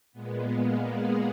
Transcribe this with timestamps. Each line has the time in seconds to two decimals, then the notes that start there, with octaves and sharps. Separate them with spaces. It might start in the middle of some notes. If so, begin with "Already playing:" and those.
0.12 A#2 G#3 B3
0.51 A#3
0.89 G#4